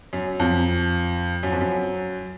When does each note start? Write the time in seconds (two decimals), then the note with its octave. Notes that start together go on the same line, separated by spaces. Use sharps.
0.13 F#2
0.40 F2
1.43 F#2
1.52 F2
1.61 F#2